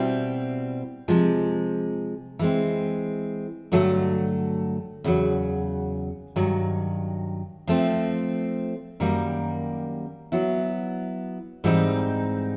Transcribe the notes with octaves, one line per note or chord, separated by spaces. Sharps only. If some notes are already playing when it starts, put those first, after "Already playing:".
Already playing: B2 G3 C4 E4
C3 F3 G#3
E3 G#3 C4
G2 D3 F#3 A3
E2 C#3 F#3
G2 D#3 F#3
F3 A3 C4
F#2 D#3 G3 A#3
F#3 B3 E4
G#2 E3 G3 C4 D#4